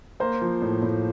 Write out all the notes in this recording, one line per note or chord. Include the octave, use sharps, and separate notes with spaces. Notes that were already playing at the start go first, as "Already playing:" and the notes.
A#3 C5
F3
A2
A2